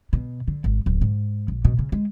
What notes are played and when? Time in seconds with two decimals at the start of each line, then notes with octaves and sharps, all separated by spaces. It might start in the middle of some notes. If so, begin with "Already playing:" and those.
0.13 B2
0.48 D3
0.64 G#1
0.86 D1
1.01 G#2
1.48 A#1
1.65 B2
1.79 C#3
1.92 G#3